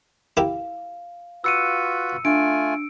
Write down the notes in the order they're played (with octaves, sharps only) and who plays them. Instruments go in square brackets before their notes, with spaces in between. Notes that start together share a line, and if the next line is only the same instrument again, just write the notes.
[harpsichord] E4 G4 A#4 [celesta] F5
[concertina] F4 F#4 B4 [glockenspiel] E6 C#7 D#7
[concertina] A3 F4 G#5 [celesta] D4 [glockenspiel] D7